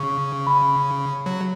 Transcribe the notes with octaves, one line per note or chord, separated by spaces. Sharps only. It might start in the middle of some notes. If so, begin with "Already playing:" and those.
Already playing: C#3 C#6
B5
F#3